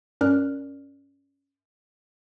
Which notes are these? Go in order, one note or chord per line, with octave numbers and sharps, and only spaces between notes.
G2 C#4 A#4 D5 F6 F#6